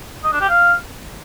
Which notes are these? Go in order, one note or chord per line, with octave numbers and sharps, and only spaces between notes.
D#5
D4
G4
F5